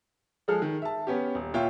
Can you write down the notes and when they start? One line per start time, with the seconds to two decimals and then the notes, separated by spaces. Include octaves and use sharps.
0.48 F3 G#3 G#4 A4 F6
0.62 D#3
0.82 E5 A5
1.07 B3 C#4 G4
1.35 D#1
1.54 A#2 F4 C#5 E5 G5